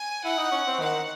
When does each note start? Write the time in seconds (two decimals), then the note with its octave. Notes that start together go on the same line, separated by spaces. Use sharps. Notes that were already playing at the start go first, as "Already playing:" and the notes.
Already playing: G#5
0.24 E4 F#5
0.38 D#4
0.52 C#4
0.67 C4
0.80 D#3 F#5